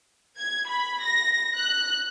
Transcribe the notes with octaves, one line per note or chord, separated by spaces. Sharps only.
G#6
B5
A#6
F#6